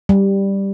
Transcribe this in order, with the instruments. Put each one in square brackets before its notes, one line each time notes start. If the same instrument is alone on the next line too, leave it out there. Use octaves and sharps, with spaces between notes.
[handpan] G3